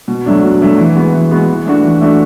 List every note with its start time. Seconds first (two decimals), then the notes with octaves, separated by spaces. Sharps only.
0.08 B2
0.26 F#3 A3 D4
0.43 B2
0.61 F#3 A3 D4
0.78 E3
0.96 G#3 B3 F#4
1.14 E3
1.31 G#3 B3 F#4
1.48 E3
1.66 A3 D4 F#4
1.83 E3
2.01 A3 D4 F#4